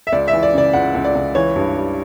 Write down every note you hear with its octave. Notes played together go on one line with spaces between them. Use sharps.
E5
C#2 D5
E5
E3
D5
C#3 D5
C#2 F#5
C#2
D5
C#2
E3 C#5
G2
G3